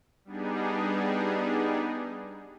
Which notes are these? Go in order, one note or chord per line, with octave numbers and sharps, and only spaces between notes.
G3 B3 D4 D#4 G#4